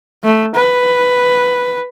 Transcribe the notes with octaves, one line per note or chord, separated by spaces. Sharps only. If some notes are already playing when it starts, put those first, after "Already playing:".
A3
B4